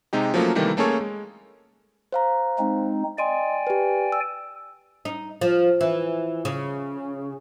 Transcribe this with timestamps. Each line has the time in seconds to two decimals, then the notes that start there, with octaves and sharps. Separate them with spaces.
0.13 C3 G#3 D#4 G4
0.34 F3 F#3 A3 A#3 C#4
0.55 C3 D#3 E3 G3 A3 A#3
0.77 A3 A#3 C#4 G#4 A4 C#5
1.01 G#3
2.12 C5 F5 A#5
2.59 G#3 C4 D#4
3.18 D5 D#5 G5 G#5 C6
3.67 G4 B4
4.12 E6
5.05 D#4
5.41 F3
5.81 E3
6.45 C#3